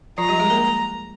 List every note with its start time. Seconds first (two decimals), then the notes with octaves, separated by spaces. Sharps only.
0.18 F3 F4 A#5
0.29 G3 G4
0.39 G#3 G#4
0.50 A#3 A#4